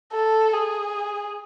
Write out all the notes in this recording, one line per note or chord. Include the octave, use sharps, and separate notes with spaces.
A4
G#4